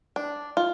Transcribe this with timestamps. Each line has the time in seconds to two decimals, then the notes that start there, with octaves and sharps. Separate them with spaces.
0.16 D4
0.57 F4